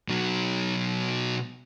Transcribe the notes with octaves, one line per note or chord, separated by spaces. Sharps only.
B2 F#3